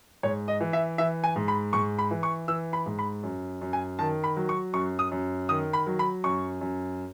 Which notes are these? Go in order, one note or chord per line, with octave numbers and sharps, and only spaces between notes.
G#2 C#5
D#5
E3
E5
E3 E5
G#5
G#2
B5
G#2 C#6
B5
E3
C#6
E3 E6
B5
G#2
B5
F#2
F#2
G#5
D#3 A5
B5
F#3
C#6
F#2 C#6
D#6
F#2
D#3 D#6
B5
F#3
B5
F#2 C#6
F#2